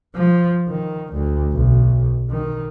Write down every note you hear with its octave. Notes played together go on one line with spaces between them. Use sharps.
F3
D#3
D2
B1
D#3